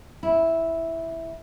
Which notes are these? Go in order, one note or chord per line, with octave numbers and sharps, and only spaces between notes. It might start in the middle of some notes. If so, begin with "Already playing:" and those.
E4